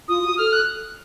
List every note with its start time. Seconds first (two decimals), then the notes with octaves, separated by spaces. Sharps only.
0.08 F4 D#6
0.23 F#4
0.37 A4 F6
0.53 F#6